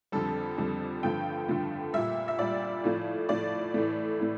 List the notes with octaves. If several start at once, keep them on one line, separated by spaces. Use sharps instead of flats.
F2 D3 G3 A4
F2 D3 G3
G2 D3 F3 A3 G5
G2 D3 F3 A3
A#2 G3 E5
E5
A#2 G3 D5
A2 F3 A3
A2 F3 A3 D5
A2 E3 A3
A2 E3 A3